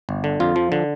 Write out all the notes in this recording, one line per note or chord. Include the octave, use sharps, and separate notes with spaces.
G1
D3
F2 F4
F3
D3